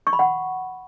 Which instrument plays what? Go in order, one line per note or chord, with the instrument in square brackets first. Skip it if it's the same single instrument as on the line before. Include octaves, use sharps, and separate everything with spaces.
[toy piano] C#6
B5
F#5